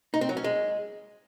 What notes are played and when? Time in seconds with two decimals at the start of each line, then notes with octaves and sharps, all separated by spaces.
0.14 D#4
0.21 C4
0.29 F#3
0.37 C#4
0.44 G#3